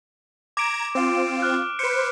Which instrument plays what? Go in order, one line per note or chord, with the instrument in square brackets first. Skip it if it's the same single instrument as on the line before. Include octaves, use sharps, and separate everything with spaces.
[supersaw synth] A#5 G#6 [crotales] D6 D7
[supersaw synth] C4 F4
[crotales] F6 F#6
[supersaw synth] B4 C5 [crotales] C#7